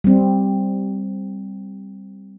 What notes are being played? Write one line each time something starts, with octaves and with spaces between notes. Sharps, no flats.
G3 C4